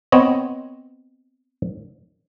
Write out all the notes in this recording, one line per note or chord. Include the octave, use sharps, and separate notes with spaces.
B3 C4 C#5 D#5